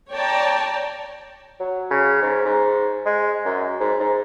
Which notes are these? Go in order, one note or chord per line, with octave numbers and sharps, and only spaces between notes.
C#5 D5 G5 A5 A#5
F#3
C#3
G#2
G#2
G#3
F#2
G#2
G#2